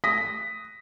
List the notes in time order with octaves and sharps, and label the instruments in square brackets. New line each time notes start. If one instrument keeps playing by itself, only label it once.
[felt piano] D#6 A#6 B6